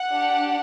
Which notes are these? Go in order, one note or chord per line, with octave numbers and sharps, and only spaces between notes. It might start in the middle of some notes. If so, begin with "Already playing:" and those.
Already playing: F#5
D4 G4